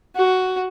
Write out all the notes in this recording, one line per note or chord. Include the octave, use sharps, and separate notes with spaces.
F#4